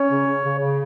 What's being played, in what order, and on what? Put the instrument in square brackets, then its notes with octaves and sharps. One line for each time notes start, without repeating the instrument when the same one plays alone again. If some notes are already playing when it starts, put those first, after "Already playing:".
Already playing: [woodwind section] C#4 C#5
C#3
C#3
C#3
C#3